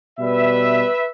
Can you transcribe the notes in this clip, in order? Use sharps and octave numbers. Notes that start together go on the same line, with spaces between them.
B2 G3 B4 E5